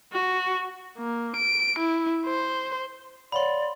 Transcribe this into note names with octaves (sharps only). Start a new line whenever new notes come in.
F#4
A#3
D7
E4
C5
C#5 D5 F5 F#5 B5 C6